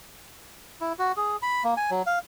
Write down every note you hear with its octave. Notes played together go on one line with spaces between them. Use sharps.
E4
F#4
G#4
B5
A#3
G#5
F#3
F5